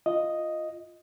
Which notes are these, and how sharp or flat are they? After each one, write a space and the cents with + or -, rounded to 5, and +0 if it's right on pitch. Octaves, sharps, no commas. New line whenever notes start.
F4 -5 D#5 +0